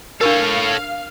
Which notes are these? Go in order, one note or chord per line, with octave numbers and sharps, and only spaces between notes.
D4 A4 A#4 C#5 F5